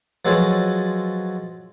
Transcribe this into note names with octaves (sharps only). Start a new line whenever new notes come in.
F3 F#3 G#3 A4 B4 C#5